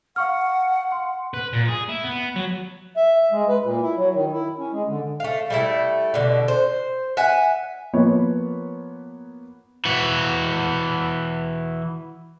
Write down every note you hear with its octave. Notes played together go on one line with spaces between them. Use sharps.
F5 F#5 C#6 F6
C6
B4
A#2
G#4
E4
B3
F#3
E5
G#3
B4
A#2
E4
F#3
D#3
E4
C#4
G#3
D3
A3 F5
G3 A3 E4
B2 D3
C5
E5 F#5 G#5
F3 A#3 B3 B4 C#5
E3 F#4